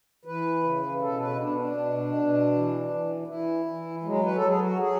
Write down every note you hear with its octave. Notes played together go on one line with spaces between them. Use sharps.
E3 B4
C#3
B2 A4
B4
B2 D4
D4
B2
B2
E3
E3
E3 E4
E3
F#3 G#3
B4
A4
F#3
G#4
F#4
F#3 G#4